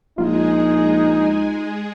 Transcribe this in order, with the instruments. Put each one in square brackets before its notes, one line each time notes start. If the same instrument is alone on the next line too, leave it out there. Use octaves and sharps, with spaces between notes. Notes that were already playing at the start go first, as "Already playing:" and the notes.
[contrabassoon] A#1 [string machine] G#3 G#4 [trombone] D#4 [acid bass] F4